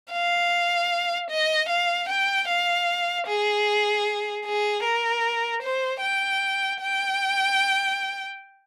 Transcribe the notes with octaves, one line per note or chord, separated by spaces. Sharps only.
F5
D#5
F5
G5
F5
G#4
G#4
A#4
C5
G5
G5